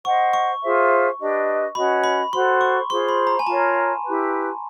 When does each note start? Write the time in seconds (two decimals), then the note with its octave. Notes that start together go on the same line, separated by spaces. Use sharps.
0.05 C5 D#5 F#5 C#6
0.33 C#6
0.62 F4 G#4 C5 E5
1.19 D4 G4 B4 D#5
1.75 C#4 F#4 B4 D#5 B5
2.04 B5
2.32 F#4 A4 C5 C6
2.61 C#6
2.90 F4 G#4 C5 C6
3.09 B5
3.27 A#5
3.39 G#5
3.46 F4 A#4 C#5 A5
4.03 E4 G4 B4